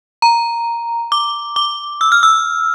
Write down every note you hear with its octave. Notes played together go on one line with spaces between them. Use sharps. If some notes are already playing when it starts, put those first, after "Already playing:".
A#5
D6
D6
E6
F6
E6